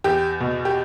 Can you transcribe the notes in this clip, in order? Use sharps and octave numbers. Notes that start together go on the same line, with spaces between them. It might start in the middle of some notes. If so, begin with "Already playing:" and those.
E2 G4
B2
G4